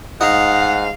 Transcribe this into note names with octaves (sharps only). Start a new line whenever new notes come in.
G#2 D#4 F5 F#5